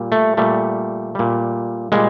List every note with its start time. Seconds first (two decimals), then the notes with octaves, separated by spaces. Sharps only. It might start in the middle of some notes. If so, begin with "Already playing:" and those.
Already playing: A#2 G3
0.12 A3
0.37 A#2 G3 A3
1.15 A#2 G3
1.92 A#2 G3 G#3